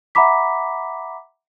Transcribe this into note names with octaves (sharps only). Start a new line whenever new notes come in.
E5 F#5 A#5 B5 D6 B6